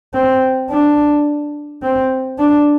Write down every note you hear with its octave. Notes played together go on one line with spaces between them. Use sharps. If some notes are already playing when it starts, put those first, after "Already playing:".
C4
D4
C4
D4